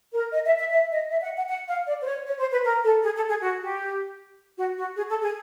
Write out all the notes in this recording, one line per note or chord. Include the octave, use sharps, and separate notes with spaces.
A#4
D#5
E5
E5
E5
D#5
E5
F#5
F#5
F#5
F5
D5
C5
C#5
C#5
C5
B4
A#4
A4
G#4
A4
G#4
F#4
G4
F#4
F#4
G#4
A4
G#4